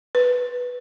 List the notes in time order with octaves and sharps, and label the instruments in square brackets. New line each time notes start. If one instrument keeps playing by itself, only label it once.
[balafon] B4